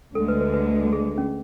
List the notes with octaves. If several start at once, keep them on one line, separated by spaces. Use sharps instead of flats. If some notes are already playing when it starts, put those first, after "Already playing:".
D2 D3 G#3 A4
B4
B4
B4
G#4
C#4